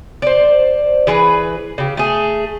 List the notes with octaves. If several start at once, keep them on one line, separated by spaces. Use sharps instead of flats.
C5 D5
E3 G#4 B4
C#3 G4
A3 G#4